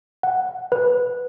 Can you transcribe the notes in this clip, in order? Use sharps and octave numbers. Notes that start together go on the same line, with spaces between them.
F#5
B4